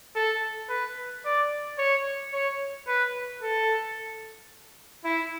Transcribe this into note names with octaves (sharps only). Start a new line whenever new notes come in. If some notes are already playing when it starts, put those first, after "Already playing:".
A4
B4
D5
C#5
C#5
B4
A4
E4